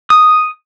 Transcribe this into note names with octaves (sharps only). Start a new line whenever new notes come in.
D#6